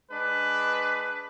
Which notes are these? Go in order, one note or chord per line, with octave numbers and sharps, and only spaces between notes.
G#3 D4 B4